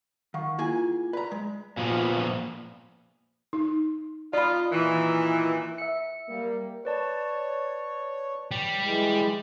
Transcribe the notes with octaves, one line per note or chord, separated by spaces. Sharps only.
D#3 F5 F#5 C#6
A#3 E4 F4 G#4 G#5
B4 D5 A#5
G#3
A#2 F3 B3
D#4
B3 D#4 F4 D5 B5
A#2 D#3 E3
E5 C#7
G3 A#3
B4 C#5 D5 A5
G3
E3 G#3